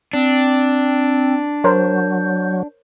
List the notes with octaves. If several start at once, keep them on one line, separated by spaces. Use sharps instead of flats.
C4 D4
F#3 A#4 C5 C#5 G6